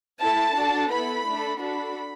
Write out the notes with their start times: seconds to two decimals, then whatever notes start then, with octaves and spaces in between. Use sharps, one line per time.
0.21 A3 E4 A4 A5
0.56 D4 F#4 A4
0.91 B3 E4 A4 B5
1.26 A3 D4 A4
1.60 D4 F#4 A4 B5